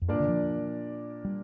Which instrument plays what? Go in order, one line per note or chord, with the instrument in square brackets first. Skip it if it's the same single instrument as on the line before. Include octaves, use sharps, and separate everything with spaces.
[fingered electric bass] F2
[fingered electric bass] G2 [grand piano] A#2 A#3 D4 A#4 D5
[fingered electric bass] D3
F3
G3